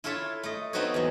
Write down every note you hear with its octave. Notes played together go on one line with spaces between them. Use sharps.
E4 F4 A4 C#5 E5
A3 D#5
B3 C4 D#4 F#4 B4 C#5
E2 F#3